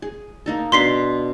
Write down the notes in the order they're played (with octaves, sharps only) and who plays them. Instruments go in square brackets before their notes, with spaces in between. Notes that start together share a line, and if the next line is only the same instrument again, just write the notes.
[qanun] G#4
A#3 D#4 A4
[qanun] B2 D4 [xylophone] C6 B6 C7